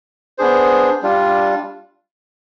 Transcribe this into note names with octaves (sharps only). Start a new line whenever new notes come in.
B3 D4 G#4 C5
G3 D4 F4